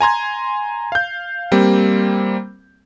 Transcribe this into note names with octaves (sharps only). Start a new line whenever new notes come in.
G#5 A#5 C6 G#6
F5 G6
G3 A#3 C4